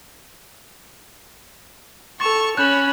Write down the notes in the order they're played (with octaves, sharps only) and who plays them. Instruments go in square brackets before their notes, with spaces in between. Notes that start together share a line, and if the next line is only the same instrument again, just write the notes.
[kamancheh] A4 C#6 [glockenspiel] A6 E7 F7
[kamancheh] C#4 B5 [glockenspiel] F#6 G6 E7